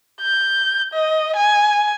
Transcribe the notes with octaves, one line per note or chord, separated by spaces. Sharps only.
G6
D#5
G#5